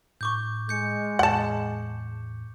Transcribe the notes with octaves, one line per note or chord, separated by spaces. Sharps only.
A2 C#6 D6 G6
G#3 G6 C#7
E2 A2 F#5 A5